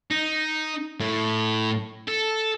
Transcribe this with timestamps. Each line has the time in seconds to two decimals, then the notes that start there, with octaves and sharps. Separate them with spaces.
0.10 D#4
1.00 A2
2.08 A4